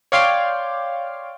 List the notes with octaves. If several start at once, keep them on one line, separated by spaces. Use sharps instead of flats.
C#5 D5 F5 G5 C6 D6